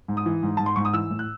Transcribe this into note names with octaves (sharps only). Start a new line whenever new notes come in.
G#2
D#6
E3
G#2
G#2 A5
C6
G#2 C#6
D#6
E3 E6
A2
F#6